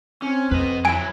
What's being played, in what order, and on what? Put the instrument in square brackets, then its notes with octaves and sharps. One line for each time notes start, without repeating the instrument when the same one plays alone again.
[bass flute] C4 [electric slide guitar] C#4
[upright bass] F2 [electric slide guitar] B4 D#5
[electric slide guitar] F#3 E4 [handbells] G#5 D7